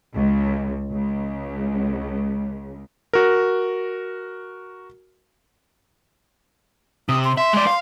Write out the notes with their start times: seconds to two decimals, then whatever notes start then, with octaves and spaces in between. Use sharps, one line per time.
0.15 C#2
0.91 C#2
3.13 F#4 A#4
7.09 C3 D#6
7.24 C6
7.37 E5 C6
7.53 G#3 D5
7.67 F5